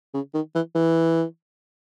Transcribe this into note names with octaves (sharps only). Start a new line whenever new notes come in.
C#3
D#3
E3
E3